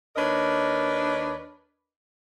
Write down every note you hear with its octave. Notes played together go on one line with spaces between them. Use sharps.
D#2 D4 A#4 B4 C#5 D#5